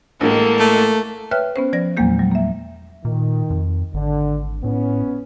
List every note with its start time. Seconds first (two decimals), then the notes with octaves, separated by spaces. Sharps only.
0.21 A1 A2 G#3 A#3 A4
0.60 A3
1.31 B4 C#5 E5 G5 F6 F#6
1.56 B3 C#4 C5
1.73 F3 D5 A#6
1.97 E2 A#2 F#3 G#3 A#3 G6
2.19 F#3 G3
2.31 A#3 E5
3.05 A#2 D#3
3.50 F2
3.94 G#1 D3
4.64 A2 B3 C#4